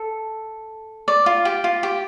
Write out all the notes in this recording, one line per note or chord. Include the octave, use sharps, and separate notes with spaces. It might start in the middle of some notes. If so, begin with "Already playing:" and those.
Already playing: A4
D5
F4
G4
F4
G4